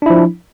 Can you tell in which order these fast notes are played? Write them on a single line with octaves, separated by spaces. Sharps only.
D4 E4 F3